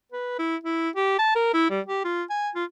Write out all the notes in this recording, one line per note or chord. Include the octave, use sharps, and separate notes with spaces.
B4
E4
E4
G4
A5
A#4
E4
G3
G4
F4
G#5
F4